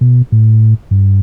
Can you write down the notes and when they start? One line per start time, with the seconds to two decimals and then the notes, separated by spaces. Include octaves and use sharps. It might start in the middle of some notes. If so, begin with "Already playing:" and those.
0.01 B2
0.32 A2
0.91 G2